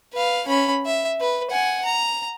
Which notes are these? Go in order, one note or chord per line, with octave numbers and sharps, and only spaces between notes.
B4 F5
C#4 B5
E5
B4
F#5 G#5
A#5